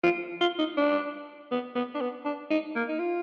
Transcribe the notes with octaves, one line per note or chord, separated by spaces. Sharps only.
F4
F4
D#4
D4
B3
B3
D4
B3
D4
D#4
A#3
D#4
F4